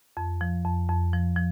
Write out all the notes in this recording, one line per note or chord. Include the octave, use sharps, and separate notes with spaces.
F2
F3
F2
F2
F3
F3